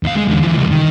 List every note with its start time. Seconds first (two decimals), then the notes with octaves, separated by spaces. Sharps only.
0.03 D#2 F5
0.15 G#3
0.28 E2 D3
0.41 E3 F3
0.57 C#2 G3
0.71 D#3